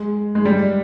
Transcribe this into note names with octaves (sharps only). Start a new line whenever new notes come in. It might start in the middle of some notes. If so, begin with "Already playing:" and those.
Already playing: G#3
G#3
G3